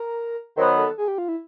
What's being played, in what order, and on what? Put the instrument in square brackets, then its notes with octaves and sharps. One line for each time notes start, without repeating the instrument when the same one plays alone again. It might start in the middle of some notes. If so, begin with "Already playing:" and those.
Already playing: [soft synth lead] A#4
[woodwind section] D#3 F#3 B3 [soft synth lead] C5
[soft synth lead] A4
G#4
G4
F4
E4